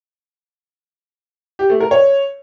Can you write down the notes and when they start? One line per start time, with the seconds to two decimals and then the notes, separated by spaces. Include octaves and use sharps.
1.59 G4
1.70 A3
1.80 A#4
1.91 C#5